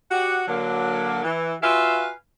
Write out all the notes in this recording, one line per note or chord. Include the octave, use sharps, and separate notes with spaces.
F#4 G4 D5 F#5
D3 F#3 A#3
E3
F4 F#4 B4 E5 F5 G#5